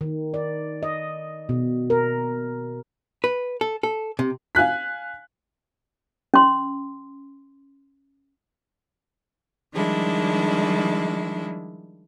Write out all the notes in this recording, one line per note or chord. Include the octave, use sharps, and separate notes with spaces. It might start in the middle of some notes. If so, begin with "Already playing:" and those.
D#3
D5
D#5
B2
A#4
B4
A4
A4
C3
F5 G#5 F#6 B6
C#4 C6
D#3 F3 G3 G#3 D4 E4